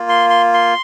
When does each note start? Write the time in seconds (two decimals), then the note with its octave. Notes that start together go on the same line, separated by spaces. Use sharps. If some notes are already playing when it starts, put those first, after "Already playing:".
Already playing: A#3 F4
0.09 C6
0.30 C6
0.54 C6